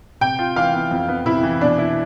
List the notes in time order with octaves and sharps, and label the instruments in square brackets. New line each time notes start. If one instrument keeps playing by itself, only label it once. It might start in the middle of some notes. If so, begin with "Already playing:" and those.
[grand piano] C3 [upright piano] G5
[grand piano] F4
[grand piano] E3 [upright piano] F5
[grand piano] B3
F2
B3
[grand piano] C3 [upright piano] E4
[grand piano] E3
[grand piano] B2 [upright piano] D4
[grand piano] E4